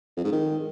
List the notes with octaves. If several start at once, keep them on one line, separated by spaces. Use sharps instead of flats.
F2
G#2
D#3